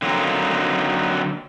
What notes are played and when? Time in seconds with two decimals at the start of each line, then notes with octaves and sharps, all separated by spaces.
0.02 D3 F#3 A#3 C4 D#4